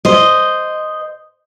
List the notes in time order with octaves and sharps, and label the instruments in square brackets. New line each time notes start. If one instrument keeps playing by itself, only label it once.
[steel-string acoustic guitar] C5 D#5